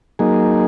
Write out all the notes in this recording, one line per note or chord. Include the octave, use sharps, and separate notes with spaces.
F#3 A#3 D#4 G#4